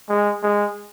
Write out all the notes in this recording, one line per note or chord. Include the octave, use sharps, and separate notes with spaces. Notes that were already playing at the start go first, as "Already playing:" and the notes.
G#3
G#3